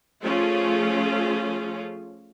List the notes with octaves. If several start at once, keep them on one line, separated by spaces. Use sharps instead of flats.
F3 A3 C#4 F4 G#4